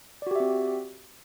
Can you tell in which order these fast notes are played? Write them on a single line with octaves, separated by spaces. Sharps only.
D5 F#4 G4 E5 C4